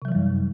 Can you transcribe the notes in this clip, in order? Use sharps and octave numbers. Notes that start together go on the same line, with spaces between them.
F#2 C3 E3 F#3 G3